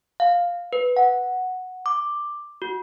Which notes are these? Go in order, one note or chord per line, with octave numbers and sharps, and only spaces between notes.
F5
B4
F#5
D6
F#4